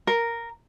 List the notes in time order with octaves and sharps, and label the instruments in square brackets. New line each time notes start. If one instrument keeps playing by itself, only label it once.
[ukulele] A#4